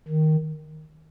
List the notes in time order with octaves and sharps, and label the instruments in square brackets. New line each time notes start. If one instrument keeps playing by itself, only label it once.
[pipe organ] D#3